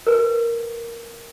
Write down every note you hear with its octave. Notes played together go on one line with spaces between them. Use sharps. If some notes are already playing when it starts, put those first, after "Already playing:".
A#4 B4